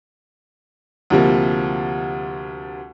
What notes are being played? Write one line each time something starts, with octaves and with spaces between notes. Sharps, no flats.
D2 C3 F3 G3 A#3